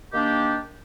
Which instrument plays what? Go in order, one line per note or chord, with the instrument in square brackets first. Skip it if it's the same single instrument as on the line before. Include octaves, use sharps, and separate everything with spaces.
[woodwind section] D#3 A#3 D4 G4